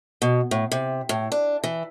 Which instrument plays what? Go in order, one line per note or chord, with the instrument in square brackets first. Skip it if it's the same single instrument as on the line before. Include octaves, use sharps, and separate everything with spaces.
[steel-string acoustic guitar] B2
A2
C3
A2
D4
E3